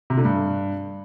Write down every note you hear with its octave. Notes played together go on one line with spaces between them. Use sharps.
C3
D3
G2